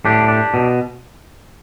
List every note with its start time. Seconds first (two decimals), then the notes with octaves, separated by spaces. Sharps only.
0.05 A2 D4 G4
0.28 D4
0.54 B2